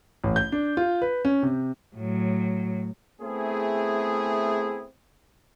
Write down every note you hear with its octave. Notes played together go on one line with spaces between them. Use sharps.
A1
G6
D4
F4
B4
C#4
C3
A2 F#3
A3 B3 C4 E4 G#4